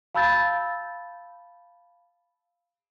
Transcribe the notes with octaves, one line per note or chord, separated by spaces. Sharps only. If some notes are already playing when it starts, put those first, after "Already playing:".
F5 A5 B5 E6 G6 A6